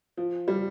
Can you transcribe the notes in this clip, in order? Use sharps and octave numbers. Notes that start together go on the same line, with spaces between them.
F3
G3